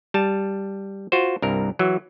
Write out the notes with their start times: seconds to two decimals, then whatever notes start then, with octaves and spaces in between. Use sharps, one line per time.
0.14 G3 A5
1.12 F4 F#4 C5
1.42 C2 G2 A#4
1.79 E3 F#3